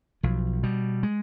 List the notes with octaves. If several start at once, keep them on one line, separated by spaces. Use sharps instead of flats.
B1 F3
B2 G3
G#3